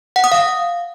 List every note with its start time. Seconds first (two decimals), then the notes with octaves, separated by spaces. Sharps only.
0.16 F#5
0.24 D#6
0.32 F5